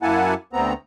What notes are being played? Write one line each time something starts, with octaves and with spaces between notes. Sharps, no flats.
F#2 A#3 E4 F#5 G#5 A5
D2 B3 C4 A#5